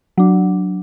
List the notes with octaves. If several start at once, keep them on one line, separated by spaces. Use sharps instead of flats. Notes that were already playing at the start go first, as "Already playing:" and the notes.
F#3 D4